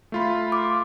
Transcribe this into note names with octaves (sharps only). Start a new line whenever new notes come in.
A3 F4 B5
D6